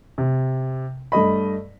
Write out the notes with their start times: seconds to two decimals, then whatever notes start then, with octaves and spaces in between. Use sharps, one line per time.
0.18 C3
1.12 G2 A3 D#5 B5